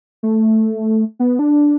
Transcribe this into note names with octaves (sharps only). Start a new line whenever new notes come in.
A3
B3
D4